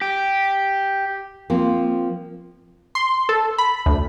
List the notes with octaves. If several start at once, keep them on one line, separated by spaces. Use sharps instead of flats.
G4
F3 A#3 C4
C6
A4
B5
D2